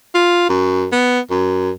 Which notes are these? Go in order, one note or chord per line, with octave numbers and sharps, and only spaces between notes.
F4
F#2
B3
F#2